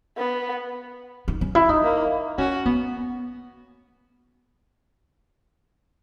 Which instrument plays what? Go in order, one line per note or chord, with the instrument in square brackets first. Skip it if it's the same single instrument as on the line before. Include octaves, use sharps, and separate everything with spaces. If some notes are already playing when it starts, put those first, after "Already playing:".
[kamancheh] B3
[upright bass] D#4
C#4
E4
D#4
[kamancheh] A#3
[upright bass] C#4 [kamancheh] F#4
[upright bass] B3